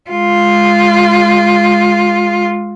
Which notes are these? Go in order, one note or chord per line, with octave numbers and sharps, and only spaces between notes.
G#3 F4